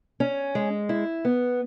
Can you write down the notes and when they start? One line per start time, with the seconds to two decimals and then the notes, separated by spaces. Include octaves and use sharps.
0.20 C#4
0.55 G#3
0.89 E4
1.25 B3